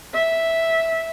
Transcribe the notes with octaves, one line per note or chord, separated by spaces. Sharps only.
E5